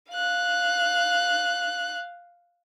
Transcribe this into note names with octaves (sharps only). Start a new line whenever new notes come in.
F5 F#6